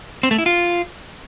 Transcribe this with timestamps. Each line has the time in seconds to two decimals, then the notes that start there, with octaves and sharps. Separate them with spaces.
0.23 C4
0.31 A3
0.38 E4
0.46 F4